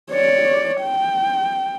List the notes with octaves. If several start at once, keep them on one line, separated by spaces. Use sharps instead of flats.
C#5 D5
G5